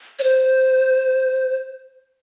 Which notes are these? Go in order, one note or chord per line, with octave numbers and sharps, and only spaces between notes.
C#5
C5